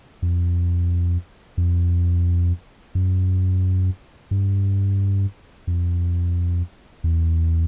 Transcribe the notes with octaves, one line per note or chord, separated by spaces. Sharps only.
F2
F2
F#2
G2
F2
E2